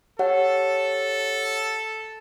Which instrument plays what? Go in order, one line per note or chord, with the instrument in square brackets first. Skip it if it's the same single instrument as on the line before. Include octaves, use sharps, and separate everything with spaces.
[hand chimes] G4 C#5 F#5 [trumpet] A4